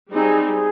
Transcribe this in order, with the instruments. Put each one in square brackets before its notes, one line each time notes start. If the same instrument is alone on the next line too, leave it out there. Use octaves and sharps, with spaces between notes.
[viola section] G3 C4 D#4 [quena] G#4
[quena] G#4